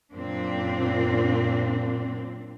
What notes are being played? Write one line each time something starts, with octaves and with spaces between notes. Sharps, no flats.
F#2 A#2 C4 D4